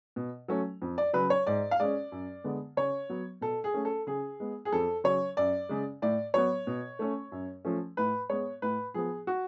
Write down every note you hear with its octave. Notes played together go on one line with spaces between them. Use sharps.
B2
F#3 A3 C#4
F2
D5
C#3 F#3 B4
C#5
G#2 D5
F5
G#3 C#4 D5
F#2
D3 G#3 B3
C#3 C#5
F#3 B3
B2 A4
G#4
A3 C#4
A4
C#3 G#4
G#3 B3
G#4
F2 A4
C#3 F#3 C#5
F#2 D5
C#3 G#3
A2 D5
F#3 B3 C#5
B2
A3 C#4
F#2
F3 A3 C#4
A2 B4
G#3 B3 C#5
A2 B4
F3 B3 G#4
F#4